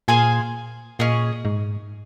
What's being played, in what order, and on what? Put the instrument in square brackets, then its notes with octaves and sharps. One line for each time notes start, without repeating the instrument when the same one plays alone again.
[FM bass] A#2 [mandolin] G#4 C5 F5 G#5
[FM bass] A#2 [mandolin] C#4 G#4 D#5
[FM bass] G#2